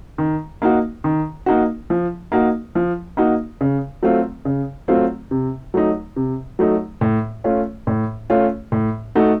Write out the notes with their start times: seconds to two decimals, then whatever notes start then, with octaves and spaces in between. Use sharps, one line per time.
0.18 D#3
0.62 A#3 D#4 F#4
1.04 D#3
1.46 A#3 D#4 F#4
1.90 F3
2.32 A#3 D#4 F#4
2.75 F3
3.17 A#3 D#4 F#4
3.61 C#3
4.02 F#3 A3 C4 F4
4.45 C#3
4.88 F#3 A3 C4 F4
5.31 C3
5.74 F#3 A3 D#4
6.16 C3
6.59 F#3 A3 D#4
7.01 A2
7.44 A3 C#4 F4
7.87 A2
8.30 A3 C#4 F4
8.72 A2
9.15 A3 D#4 F#4